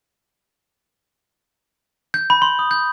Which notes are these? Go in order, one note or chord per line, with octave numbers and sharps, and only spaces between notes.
G6
B5
C6
D#6
G6